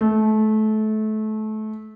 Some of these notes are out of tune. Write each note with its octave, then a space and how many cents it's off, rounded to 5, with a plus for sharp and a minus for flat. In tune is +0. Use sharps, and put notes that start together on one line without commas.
A3 -25